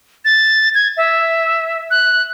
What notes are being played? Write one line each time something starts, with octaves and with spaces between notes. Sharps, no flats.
A6
G#6
E5
F#6